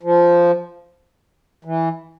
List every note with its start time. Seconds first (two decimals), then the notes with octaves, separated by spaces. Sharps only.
0.03 F3
1.65 E3